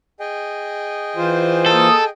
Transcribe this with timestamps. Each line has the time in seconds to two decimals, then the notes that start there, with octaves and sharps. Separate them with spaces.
0.20 G#4 D#5 G5
1.16 E3 F4 C5
1.66 A#3 A4 D#6